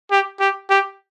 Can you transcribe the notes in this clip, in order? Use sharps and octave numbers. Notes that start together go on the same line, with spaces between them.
G4
G4
G4